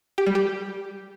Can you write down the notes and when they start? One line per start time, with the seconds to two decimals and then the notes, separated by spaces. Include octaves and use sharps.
0.18 G4
0.26 G3
0.35 G4